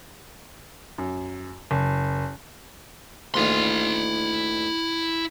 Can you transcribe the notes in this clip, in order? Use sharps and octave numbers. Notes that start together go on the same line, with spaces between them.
F#2
F#1
D2 A#2 D#3 E4 C6